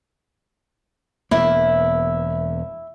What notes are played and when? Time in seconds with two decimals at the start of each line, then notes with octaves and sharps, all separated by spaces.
1.31 E1 E2 A#3 E4